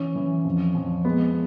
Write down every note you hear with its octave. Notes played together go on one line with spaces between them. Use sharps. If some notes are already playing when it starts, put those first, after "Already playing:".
Already playing: E3 C#4
E3
F2
F2
G#3 B3